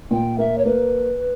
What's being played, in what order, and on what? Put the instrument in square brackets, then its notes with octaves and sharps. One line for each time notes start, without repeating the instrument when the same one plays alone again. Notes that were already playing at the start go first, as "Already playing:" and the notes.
[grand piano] A#2 [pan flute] G5
[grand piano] A#3 [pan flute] E5
[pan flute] C#5
[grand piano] A#3 [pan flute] B4